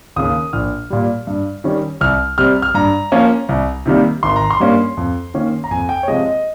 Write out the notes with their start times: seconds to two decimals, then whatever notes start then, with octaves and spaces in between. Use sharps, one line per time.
0.16 D#2 C#3 D#6
0.53 A#1 F6
0.90 A#2 G3
1.27 G2
1.64 D#3 G3 C#4
2.01 C2 F6
2.38 C3 G3 C4 F6
2.62 F6
2.74 G2 A#5
3.12 F3 A#3 C#4
3.49 C2
3.86 C3 D#3 G3 A#3
4.23 G#1 C6
4.36 A#5
4.50 C6
4.60 G2 G3 A#3 C#4
4.97 F2
5.34 D#3 A#3 C#4
5.64 A#5
5.71 F2 G#5
5.89 G5
6.03 C#5
6.08 C3 F3 G#3 D#5
6.26 D#5